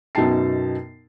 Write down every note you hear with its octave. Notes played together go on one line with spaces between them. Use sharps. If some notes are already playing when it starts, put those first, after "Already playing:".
F#2 B2 D#4 G5 A5 C7